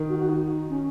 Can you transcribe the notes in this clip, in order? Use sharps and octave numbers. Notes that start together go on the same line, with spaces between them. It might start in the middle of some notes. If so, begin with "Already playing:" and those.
Already playing: D#3
F#4
F#4
D#4
C#4